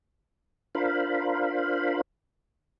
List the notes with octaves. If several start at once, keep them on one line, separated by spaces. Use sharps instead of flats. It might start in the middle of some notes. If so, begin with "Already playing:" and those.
D4 F4 A#4 C5 F5 B5